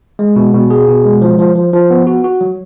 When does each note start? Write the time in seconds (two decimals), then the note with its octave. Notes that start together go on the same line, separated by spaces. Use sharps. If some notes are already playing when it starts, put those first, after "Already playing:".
0.19 G#3
0.36 B2
0.54 B2
0.70 G#4
0.88 B2
1.05 G#3
1.22 F3
1.39 F3
1.55 F3
1.73 F3
1.90 B3
2.07 F#4
2.24 F#4
2.41 F#3